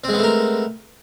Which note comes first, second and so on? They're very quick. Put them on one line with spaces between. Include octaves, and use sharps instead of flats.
C4 G#3 B3 A3 A#4